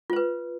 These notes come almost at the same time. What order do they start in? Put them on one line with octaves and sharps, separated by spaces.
F4 C5 B4